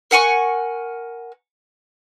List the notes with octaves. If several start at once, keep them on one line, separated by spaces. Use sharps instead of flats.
A#4 F#5 G#5 C#6